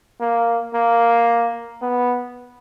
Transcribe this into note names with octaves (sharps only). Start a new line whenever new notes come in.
A#3
A#3
B3